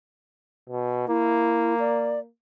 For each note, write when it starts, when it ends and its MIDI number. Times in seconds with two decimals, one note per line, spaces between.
0.70 1.08 47
1.08 2.27 58
1.08 1.75 64
1.79 2.19 74